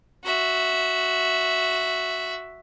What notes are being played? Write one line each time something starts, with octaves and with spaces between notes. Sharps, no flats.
F#4 E5